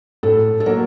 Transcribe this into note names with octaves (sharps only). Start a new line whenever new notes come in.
A2 A4
A4
F#3 A#3 A#4